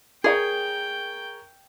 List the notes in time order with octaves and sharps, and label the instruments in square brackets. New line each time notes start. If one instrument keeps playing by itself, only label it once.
[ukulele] G#4 [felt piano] A#4 C#5 C#7 [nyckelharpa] G5